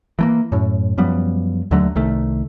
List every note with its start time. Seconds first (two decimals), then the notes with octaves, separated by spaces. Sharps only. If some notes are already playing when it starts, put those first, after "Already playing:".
0.19 E3 A3 A#3
0.52 F#2 A2
0.98 F#2 F3 G3 B3
1.71 D#2 D3 F#3 A3
1.95 C2 D#3 A3